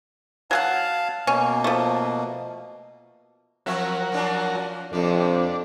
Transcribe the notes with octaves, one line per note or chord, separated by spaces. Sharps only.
F#3 G#4 F5 F#5 A5
B2 A#3 C#4
F3 A3
F3 F#3 C4 F#4 A#4 E5
F3 C#4 D4
F2 C3 F3 D4